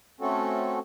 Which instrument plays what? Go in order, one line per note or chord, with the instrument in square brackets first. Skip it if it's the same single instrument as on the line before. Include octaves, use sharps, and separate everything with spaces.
[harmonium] A3 C4 C#4 F#4 A4